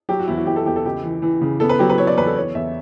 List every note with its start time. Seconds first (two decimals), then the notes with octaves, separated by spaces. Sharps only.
0.09 F#3 G4
0.19 F#4
0.28 E2 E4
0.37 F#4
0.46 E2 G4
0.56 A4
0.66 E2 G4
0.76 A4
0.85 C#2 G4
1.04 E3
1.22 E3
1.41 C#3
1.60 B3 A4
1.69 B4
1.79 F#3 G4
1.90 B4
1.98 B3 C#5
2.07 D5
2.18 E2 B4
2.26 A4
2.36 E2 C#5
2.55 E2 E5